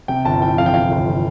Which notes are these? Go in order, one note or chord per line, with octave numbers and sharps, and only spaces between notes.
C3 G5
G1 A5
E3 G5
F2 F5
G5
C3 F5
G1
E3